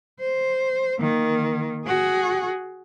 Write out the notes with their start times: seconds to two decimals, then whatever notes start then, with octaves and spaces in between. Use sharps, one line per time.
0.20 C5
1.00 D#3 A#3
1.86 F#4 G#4